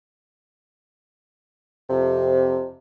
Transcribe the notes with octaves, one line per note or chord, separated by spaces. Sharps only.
F2 C3